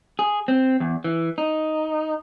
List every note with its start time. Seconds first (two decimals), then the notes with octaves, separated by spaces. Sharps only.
0.19 G#4
0.48 C4
0.80 E2
1.04 E3
1.38 D#4